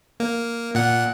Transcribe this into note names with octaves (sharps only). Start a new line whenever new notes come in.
A#3
A#2 F#5